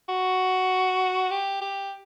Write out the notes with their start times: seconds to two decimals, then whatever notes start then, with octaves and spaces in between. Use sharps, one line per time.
0.09 F#4
1.31 G4
1.61 G4